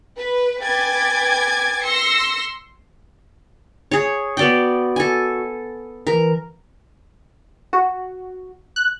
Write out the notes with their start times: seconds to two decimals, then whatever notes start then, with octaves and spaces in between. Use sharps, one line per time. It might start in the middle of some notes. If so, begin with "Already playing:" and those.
0.16 B4
0.61 B4 G5 G#5 D6 G#6 A6
1.85 C6 E6 A#6 C#7
3.91 G#4 C#5
4.37 B3 F#4 D5 G5
4.96 A4 G#5
6.07 E3 A#4
7.73 F#4
8.76 F#6